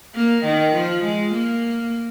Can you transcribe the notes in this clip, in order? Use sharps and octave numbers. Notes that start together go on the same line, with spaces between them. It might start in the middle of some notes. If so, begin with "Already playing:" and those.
A#3
D#3
F3
G#3
A#3